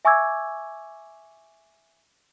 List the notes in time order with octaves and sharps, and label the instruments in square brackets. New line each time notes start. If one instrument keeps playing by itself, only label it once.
[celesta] E5 G#5 C#6 D6 E6 G#6